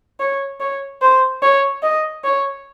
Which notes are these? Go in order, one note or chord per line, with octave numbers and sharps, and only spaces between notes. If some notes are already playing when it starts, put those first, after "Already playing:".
C#5
C#5
C5
C#5
D#5
C#5